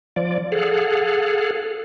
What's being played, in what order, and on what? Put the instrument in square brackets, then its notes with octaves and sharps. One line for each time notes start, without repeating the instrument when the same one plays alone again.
[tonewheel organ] F3 D5
G#4 A4 F5 F#5